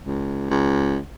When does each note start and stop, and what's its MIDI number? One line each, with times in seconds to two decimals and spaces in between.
0.04 0.45 37
0.50 0.99 37